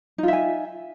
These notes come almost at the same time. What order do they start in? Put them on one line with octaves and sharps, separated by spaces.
D#4 F4 E5 G#5